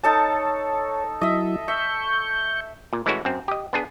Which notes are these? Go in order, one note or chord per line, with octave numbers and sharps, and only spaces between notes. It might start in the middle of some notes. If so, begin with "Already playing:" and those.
D#4 A4 C#5 A5
F#3 E4 D#5 E5
E5 C#6 G6
A#2
E3 G#3 A3 C#4 E4 F#4
F#2 C4
G4 D#5
B3 D4 G#4